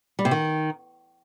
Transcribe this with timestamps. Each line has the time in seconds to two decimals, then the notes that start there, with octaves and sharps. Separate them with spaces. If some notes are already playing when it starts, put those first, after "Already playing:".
0.19 G3
0.25 C3
0.31 D#3